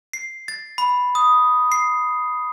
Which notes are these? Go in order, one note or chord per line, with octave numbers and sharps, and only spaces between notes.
C7
A6
B5
D#6
C7